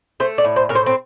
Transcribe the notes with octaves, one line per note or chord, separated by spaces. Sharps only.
A3 C5
D5
A2
C5
A2 A#4
C5
C4